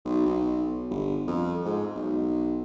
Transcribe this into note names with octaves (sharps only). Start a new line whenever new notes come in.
B1
B1
G1
F2
G#2
B1